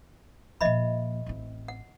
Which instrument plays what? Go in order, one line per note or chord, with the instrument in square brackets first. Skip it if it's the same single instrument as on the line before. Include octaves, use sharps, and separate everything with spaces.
[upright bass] A#2 F3 [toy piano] D#5 E5 B5
[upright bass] A1 C4
[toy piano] F#5